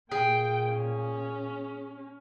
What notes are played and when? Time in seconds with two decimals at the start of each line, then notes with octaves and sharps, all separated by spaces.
0.11 A#2 G#4 G5
0.72 C#4